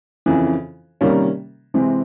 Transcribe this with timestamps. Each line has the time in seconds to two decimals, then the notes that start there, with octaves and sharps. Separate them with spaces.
0.26 F2 C#3 E3
1.01 C3 D#3 G3 A#3 C#4
1.74 C3 E3 G#3 C4